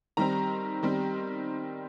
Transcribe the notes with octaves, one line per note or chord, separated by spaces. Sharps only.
D#3 G3 C4 A#5
D#3 G3 C4